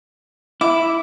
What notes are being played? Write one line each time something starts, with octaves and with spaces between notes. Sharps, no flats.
E4 D6